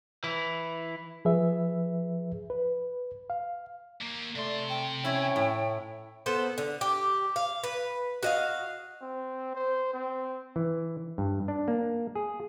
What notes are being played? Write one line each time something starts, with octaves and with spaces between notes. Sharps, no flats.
E3 E4
F3 G#4 B4 E5
B4
F5
D#2 A#3
C3 A3 D5 C6
G5
C#4 E4 C#5
A2
B3 A4 C5
D3
G4
F5
B4
F#4 D#5 F5
C4
C5
C4
E3
G2
D4
A#3
G#4